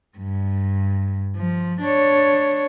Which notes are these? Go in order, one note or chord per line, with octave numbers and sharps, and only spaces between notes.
G2
F3
D4 C#5